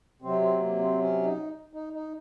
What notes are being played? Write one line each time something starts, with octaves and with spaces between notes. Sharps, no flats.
C3 F#3 C4
C4
A#3
C4
C#4
D#4
D#4
D#4